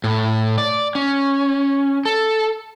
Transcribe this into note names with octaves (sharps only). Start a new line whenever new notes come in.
A2
D5
C#4
A4